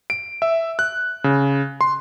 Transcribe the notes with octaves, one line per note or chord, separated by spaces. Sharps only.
D7
E5
F#6
C#3
C6